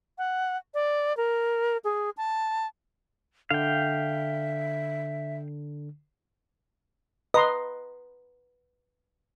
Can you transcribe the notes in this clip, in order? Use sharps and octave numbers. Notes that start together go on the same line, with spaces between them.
F#5
D5
A#4
G#4
A5
D3 E5 F5 G5
B4 D#5 A#5 C6